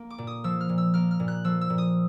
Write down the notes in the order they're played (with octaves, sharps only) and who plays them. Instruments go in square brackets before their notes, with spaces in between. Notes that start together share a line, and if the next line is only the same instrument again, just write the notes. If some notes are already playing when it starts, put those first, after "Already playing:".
Already playing: [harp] A#3
D6
A#2
D#6
F3 E6
F6
A#2
E6
A#3 F6
F6
A#2
F#6
F3 E6
E6
A#2
D#6